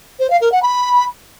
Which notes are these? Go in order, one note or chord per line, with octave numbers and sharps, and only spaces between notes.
C5
F5
A#4
F#5
B5